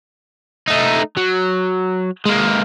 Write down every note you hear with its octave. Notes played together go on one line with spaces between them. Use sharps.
A3 D#4
F#3
G#3 A#3